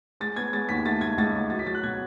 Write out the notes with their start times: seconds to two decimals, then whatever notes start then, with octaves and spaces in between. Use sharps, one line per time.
0.20 G#3 A6
0.36 B3 G#6
0.53 G#3 A6
0.69 D#2 B6
0.85 A3 A6
1.01 C#2 G#6
1.18 C#2 A6
1.34 A3
1.50 F#3 A6
1.59 B6
1.66 F#3 A6
1.75 F#6
1.83 B2 G#6